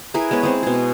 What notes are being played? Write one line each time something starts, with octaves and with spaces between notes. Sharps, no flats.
E4 G#4 A#4 B4
G#3 B3 B4 C#5
G#3 C4
B2 G#4